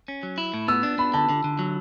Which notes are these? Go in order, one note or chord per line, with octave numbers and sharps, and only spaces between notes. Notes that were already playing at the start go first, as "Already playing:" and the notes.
C#4
F#3
E4
A2
B3 E6
D4
B3 B5
D3 A5
D3
D3
F#3